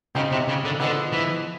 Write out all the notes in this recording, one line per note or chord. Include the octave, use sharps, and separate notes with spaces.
C#3 C4 D#4 F#4
C3
C#3
D3
D3 F3 G#3 B3
E3